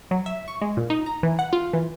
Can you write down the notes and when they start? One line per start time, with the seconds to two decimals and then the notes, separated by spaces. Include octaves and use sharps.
0.11 F#3
0.26 E5
0.48 C#6
0.62 G#3
0.77 A#2
0.90 D#4
1.06 A#5
1.23 E3
1.39 F#5
1.53 F4
1.73 E3